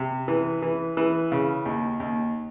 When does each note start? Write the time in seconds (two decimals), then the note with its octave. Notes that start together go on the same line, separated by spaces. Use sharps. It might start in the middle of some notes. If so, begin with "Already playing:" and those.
Already playing: C3
0.28 E3
0.62 E3
0.97 E3
1.32 C#3
1.66 D#2
2.00 D#2